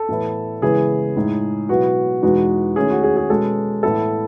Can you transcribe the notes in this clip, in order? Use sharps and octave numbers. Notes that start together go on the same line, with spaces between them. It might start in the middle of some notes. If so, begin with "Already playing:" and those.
Already playing: A4
A2 E3 B3 E4
C#3 E3 G#3 B3 E4 G#4
A2 G#3 D#4
B2 F#3 B3 E4 F#4
E2 B2 G#3 D#4 F#4
D#3 A3 C#4 E4 G#4
F#4
G#4
G#4
B2 G#3 C#4 A4
A2 E3 B3 E4 A4